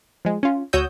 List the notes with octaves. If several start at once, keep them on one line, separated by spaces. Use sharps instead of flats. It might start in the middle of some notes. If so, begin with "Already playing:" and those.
F3 G#3
C#4 F4
D2 F#4 C#5 D#6 E6 G6